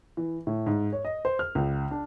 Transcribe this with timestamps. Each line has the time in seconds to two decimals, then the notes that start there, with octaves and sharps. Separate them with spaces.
0.17 E3
0.47 A2
0.66 G#2
0.92 C#5
1.05 D#5
1.25 C5
1.39 F6
1.55 C#2
1.91 D4